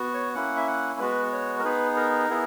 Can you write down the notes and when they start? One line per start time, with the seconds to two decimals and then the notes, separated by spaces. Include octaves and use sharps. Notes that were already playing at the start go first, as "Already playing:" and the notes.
Already playing: B3 F#4
0.14 C#5
0.35 A#3 C#4 E4 F#5
0.56 E5
0.67 F#5
1.00 G#3 B3 F#4 B4
1.32 C#5
1.59 A#4
1.64 B3 D#4 G#4 B4
1.96 A#4
2.30 B3 E4 G#4